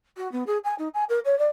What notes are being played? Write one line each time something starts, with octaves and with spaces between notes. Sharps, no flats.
F#4
B3
G#4
G#5
D#4
G#5
A#4
C#5
D5